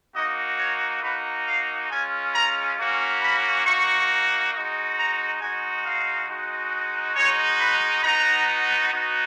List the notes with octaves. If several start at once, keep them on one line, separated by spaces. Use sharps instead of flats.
A#3 D#4 F#4 D#5
C#5
A#3 D#4 F#4 B4
F5
G#3 C#4 F4 G#5
A#5
A#3 C#4 F#4
B5
A#3 D#4 F#4 C#6
G#3 D#4 F#4
A#5
G#3 D#4 F#4 G#5
F5
G#3 D#4 F#4
G#3 D#4 F#4 C#5
B4
B3 D#4 F#4 A#5
B3 D#4 F#4